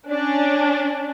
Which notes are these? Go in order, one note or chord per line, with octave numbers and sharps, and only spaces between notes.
C#4 D4